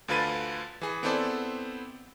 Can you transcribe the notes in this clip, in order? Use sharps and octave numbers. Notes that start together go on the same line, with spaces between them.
D2 D3 F4 B4 A6 D#7
E3 G#4
B3 C4 E4 A4 C5 D5